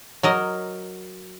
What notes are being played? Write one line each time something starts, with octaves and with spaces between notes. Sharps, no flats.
F#3 A#4 D#5